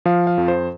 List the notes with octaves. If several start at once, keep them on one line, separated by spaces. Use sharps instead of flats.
F3 F5
F5
F2
C5